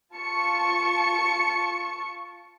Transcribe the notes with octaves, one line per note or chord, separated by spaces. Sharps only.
F4 A5 C#6 C#7